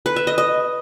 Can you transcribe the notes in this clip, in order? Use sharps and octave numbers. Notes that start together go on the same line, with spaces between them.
B4
E5
D#5
D#5